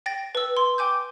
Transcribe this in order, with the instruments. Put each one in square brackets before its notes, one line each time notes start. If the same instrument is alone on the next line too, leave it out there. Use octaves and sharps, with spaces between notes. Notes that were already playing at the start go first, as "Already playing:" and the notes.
[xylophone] G5 A6 A#6
B4 E6
C6
G5 G#5 D6 G6